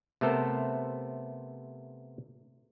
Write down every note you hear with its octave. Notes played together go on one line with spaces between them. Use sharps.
C3 A3 B3 A4 A#4 C5